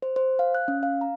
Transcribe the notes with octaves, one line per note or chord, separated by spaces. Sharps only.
C5
C5
F5
F#6
C#4
F5
A#5